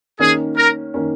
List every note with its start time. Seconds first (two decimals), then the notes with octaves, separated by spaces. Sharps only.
0.19 D#3 A#3 C#4 G#4
0.57 A#4
0.94 D#3 A#3 C#4